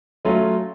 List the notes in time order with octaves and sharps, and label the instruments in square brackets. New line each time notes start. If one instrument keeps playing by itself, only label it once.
[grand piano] F#3 A3 C#4 F4